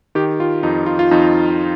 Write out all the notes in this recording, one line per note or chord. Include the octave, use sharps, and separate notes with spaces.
D#3 G4
F4
F2 D#4
F4
F4
F2 D#4